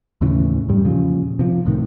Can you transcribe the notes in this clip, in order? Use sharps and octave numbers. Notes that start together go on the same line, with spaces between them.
D#2 A2 C#3 E3
F2 G#2 G3
E2 A#2 C#3 F3
C3 F3
C2 A2 C3 D#3